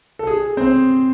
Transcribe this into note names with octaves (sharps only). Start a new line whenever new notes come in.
A4
G#4
C4 C5